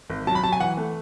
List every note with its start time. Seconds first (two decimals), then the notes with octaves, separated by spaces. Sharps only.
0.10 G#1
0.27 F#3 A5
0.35 B5
0.43 F#3 A5
0.53 G#5
0.60 E3 F#5
0.77 A3